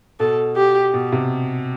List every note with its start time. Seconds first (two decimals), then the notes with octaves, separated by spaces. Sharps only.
0.20 B2 A4
0.56 G4
0.94 B2
1.12 C3